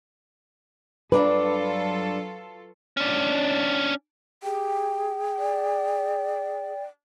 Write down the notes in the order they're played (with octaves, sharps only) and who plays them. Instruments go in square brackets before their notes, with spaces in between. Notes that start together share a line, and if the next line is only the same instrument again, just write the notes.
[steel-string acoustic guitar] G2 D4 A#5 [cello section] F#3 F4 A4 [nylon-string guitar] B4
[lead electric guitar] C#4 D4
[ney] G4 [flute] G#4 [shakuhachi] G5
[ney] D5